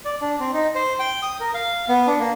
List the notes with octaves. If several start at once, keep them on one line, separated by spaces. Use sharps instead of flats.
D5
D4
C4
D#4
C5
G5
D#6
A#4
F5
B3
D4
A#3